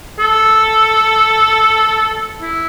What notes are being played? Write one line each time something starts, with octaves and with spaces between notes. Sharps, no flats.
A4
E4